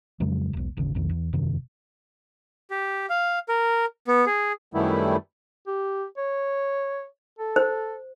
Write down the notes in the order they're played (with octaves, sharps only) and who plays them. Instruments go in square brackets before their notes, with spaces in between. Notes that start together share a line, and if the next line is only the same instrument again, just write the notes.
[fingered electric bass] F2 C#3 F#3 G#3
E1 B1
D#1 G#1 C#3
B1 F2 D#3
E2
E1 F#2 C3 D#3
[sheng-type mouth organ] G4
F5
A#4
B3
G#4
[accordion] F#2 D#3 G3 A3 B3 E4
[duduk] G4
C#5
A4
[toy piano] C5